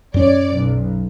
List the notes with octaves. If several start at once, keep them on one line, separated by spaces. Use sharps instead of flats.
F#2 C#4 C#5 D5
B1